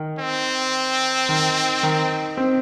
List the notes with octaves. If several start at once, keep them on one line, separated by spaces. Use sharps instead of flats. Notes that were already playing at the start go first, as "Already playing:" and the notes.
Already playing: D#3
C4
D#3
D#3
C4